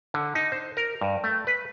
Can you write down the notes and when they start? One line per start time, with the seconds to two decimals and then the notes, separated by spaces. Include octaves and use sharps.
0.14 D3
0.35 D#4
0.52 C5
0.77 A#4
1.01 G2
1.24 A3
1.47 B4